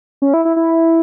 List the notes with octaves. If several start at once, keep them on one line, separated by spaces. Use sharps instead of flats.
C#4
E4
E4
E4